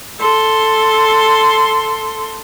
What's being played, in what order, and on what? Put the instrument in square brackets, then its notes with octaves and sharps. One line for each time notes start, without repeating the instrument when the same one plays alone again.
[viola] A4 C6